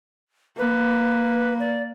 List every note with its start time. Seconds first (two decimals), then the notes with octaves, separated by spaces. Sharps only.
0.59 A#3 B4
1.60 D5